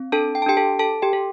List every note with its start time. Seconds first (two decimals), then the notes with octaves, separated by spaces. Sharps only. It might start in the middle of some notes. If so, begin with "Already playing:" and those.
Already playing: C4
0.12 D4 A4 A5
0.35 G5
0.42 A5
0.46 D4 G4 G5
0.57 A4 A5
0.79 A4 A5
1.02 G4 G5
1.13 A4